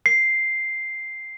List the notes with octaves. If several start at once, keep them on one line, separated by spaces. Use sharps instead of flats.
C7